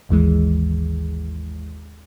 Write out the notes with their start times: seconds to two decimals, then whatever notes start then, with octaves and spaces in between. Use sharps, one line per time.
0.09 G#1 D#2 E3 G#3